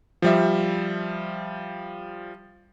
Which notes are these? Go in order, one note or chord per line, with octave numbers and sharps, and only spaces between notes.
F3 G3 E5